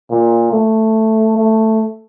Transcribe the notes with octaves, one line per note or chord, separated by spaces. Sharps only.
A#2
A3
A3